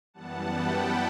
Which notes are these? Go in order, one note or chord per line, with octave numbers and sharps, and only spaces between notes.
F#2 E3 G3 B3 F#5 A5
G5 B5